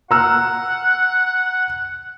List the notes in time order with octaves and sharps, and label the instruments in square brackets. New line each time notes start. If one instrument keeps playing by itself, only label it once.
[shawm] F#5 [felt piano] A#5 E6 F6